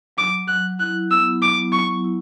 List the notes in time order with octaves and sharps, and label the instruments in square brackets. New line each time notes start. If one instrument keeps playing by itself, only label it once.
[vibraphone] F#3 [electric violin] D6
[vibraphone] F#3 [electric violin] F#6
[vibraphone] E4 [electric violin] F#6
[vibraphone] B3 [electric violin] E6
[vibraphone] F#3 [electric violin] D6
[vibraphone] F#3 [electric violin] C#6
[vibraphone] E4